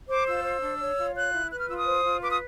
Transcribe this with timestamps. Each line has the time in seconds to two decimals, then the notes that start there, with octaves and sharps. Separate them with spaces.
0.08 C5 D6
0.26 F4 E6
0.44 C5
0.62 D4
0.79 C#5
0.98 F4
1.14 C#5 F#6
1.33 E4
1.50 B4 F#6
1.58 F6
1.68 F4 E6
1.76 D#6
1.86 C5
2.04 F4
2.21 B4 D6
2.30 D#6